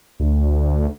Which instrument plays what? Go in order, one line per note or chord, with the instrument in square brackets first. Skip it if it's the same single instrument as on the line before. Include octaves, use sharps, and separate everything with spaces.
[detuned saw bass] D2